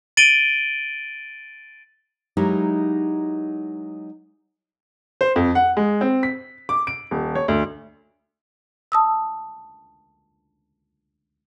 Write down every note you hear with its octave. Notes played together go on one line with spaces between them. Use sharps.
A6 D7 D#7 F#7 G7
F#3 G#3 D#4 E4 G4 A#4
C5
F2
F#5
G#3
C4
B6
D6
D7
D#1
C#5
D2
A5 D#6 E6